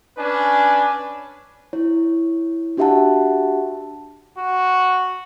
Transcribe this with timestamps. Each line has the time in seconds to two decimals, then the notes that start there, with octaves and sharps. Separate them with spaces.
0.18 C#4 D4 B4 G#5
1.73 E4 C#5
2.77 D4 F#4 G4 E5 F#5 A5
4.38 F#4